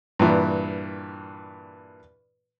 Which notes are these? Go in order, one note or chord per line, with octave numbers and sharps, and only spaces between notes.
G2 A#2 E3